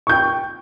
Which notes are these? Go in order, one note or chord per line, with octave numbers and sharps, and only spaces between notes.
G5 C#6 G6